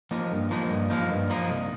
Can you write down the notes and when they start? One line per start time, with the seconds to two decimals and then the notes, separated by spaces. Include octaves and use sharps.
0.11 F3 A#3 D#4
0.31 G2
0.51 F3 A#3 D#4
0.70 G2
0.90 F3 A#3 D#4
1.10 G2
1.30 F3 A#3 D#4
1.48 C2